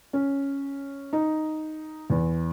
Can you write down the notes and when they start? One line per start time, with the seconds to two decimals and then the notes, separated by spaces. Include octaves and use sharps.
0.13 C#4
1.13 D#4
2.10 E2